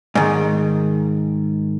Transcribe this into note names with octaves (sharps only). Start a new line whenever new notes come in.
G#2 D#3